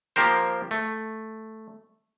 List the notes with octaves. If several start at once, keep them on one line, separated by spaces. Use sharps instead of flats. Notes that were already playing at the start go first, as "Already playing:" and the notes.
F3 A#3 G4 A#4 C5
A3